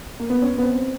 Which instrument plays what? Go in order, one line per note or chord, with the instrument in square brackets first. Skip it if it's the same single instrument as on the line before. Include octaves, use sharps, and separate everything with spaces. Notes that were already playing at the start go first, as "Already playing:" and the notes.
[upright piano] A#3
B3
C#4
B3
C4